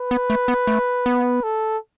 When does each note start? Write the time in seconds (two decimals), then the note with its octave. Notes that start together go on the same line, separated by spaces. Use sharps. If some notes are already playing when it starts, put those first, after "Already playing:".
Already playing: B4
0.11 B3
0.30 A3
0.48 B3
0.67 A3
1.06 B3
1.43 A4